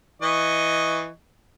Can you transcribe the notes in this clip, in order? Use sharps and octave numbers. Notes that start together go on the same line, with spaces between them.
E3 D#5 C#6